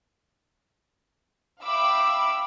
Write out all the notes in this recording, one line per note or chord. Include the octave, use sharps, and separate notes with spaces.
E5 F5 G5 B5 D6 E6